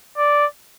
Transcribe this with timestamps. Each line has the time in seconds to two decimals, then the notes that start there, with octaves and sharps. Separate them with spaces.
0.17 D5